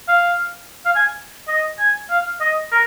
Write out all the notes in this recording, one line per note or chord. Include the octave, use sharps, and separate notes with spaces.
F5
F5
G#5
D#5
G#5
F5
D#5
A#4